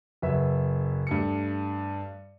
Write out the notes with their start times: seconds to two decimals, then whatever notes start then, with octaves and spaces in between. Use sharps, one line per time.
0.22 F#1 F#3 B4 E5
1.07 G2 A3 C#7